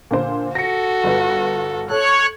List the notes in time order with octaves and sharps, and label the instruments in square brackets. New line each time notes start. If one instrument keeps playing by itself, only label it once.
[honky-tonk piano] A#2 D3 C5
[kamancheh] F#4 A4 [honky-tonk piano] A#6 C#7
[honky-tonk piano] G1 B4
[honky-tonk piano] A4 [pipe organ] C#5 [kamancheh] F#6